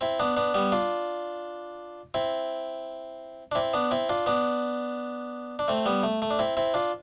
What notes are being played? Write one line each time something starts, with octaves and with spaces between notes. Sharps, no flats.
C4 E4
B3 D4
B3 D4
G3 B3
D4 F4
C4 E4
D4
C4 E4
B3 D4
C4 E4
D4 F4
B3 D4
D4
A3 C4
G3 B3
A3
A3
D4
C4 E4
C4 E4
D4 F4